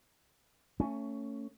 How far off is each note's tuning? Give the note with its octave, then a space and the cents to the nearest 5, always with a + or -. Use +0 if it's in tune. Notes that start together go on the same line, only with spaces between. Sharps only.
A3 +30 C#4 +0